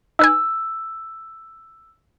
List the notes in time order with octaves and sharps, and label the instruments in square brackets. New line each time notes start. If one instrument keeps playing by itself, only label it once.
[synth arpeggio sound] D#4 B4 G#5 [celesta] E6